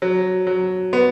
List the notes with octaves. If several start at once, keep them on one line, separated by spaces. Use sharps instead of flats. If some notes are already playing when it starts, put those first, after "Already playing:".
F#3
F#3
B3